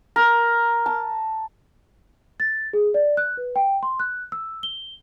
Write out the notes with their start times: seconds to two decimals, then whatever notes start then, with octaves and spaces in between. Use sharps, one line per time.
0.16 A#4
0.86 A5
2.40 A6
2.73 G#4
2.94 D5
3.17 F#6
3.37 B4
3.56 G5
3.83 C6
4.00 F#6
4.32 E6
4.63 G7